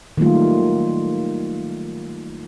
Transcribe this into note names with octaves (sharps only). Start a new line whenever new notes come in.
D#3 F#3 G3 A3 A#3 F4